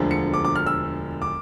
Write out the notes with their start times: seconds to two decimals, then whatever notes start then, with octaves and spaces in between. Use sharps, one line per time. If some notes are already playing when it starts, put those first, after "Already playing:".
Already playing: E1 D2 D3 F3
0.11 C#7
0.34 D6
0.45 D6
0.56 F6
0.66 E6
1.22 D6